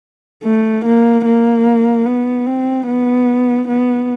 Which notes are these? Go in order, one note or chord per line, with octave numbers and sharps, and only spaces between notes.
A3
A#3
A#3
B3
C4
B3
B3